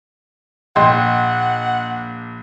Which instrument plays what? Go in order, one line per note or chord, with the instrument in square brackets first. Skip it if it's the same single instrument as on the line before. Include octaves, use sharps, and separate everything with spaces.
[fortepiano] A#1 [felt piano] D#5 G5 C6 [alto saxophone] F#5